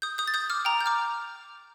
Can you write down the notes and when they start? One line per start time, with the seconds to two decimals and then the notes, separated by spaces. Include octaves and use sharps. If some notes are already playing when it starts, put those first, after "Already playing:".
0.02 D#6 G6
0.18 D#6 G6
0.27 A6
0.34 D#6 G6
0.50 D6 F6
0.65 G5 A#5
0.81 G6
0.86 D6 F6